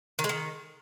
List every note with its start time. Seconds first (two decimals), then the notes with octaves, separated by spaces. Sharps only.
0.19 D#3
0.24 G#3
0.29 D#3